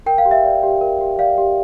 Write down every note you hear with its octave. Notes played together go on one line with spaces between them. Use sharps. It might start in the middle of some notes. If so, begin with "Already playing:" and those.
A#4 G5
F5
G4
E5
D5
G4
A#4
G4
D5 F5
G4